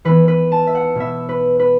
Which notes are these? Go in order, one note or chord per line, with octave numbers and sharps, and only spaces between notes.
E3 B3 B4
B4
A5
E5
F#5
B2 B3 E5
B4
B4